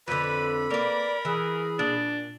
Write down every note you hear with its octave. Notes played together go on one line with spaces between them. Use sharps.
F2 D3 B4 B5
A#3 A#4 B4 D5
E3 G#4
A#2 D4